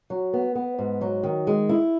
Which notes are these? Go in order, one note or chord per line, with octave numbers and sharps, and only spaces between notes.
F#3
B3
B3
G#2
F#3
D#3
G#3
E4